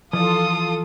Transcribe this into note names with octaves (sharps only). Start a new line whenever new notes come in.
E3 F3 F4 A4 D5 D#6